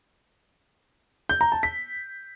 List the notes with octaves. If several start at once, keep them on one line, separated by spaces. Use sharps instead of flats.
G6
A#5
A5
B6